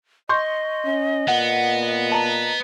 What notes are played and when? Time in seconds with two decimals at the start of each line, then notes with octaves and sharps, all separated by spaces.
0.29 D#5 C6 C#6 G6
0.85 C#4
1.28 A#2 B3 F#5
2.12 A5 A#5